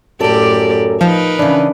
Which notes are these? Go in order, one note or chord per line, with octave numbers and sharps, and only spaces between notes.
F#2 A2 G4 A4 A#4 D5
F3 D#4 A#4 B4
C#3 E3 D4